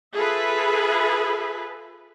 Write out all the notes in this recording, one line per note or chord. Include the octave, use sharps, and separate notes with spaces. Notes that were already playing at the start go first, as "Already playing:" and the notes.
F4 G#4 A4 B4 E5 B5